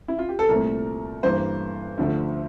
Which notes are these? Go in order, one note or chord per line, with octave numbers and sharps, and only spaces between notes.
E4
F4
G4
A4
C2 A#2 A3 C4 A#4
G2 E3 A#3 C5
D2 D3 F3 A3